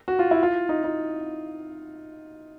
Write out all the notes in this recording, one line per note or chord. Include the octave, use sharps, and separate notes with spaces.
F#4
F4
E4
F4
D#4
D#4